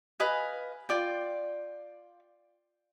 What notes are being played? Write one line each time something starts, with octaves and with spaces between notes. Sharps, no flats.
B4 D#5 F5 G#5
F4 D5 G5